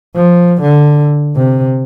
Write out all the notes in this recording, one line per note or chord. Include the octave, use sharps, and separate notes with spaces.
F3
D3
C3